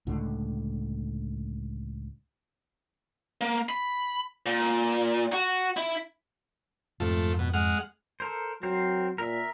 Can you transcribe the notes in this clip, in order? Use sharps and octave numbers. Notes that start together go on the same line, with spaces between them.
C#2 A2 D3
A#3
B5
A#2
F#4
E4
F2 G#2 C3 F3 A3
B2
G#3 F#5 F6
A4 A#4 C5
F#3 C4 A#4 C5
A#2 A#4 E5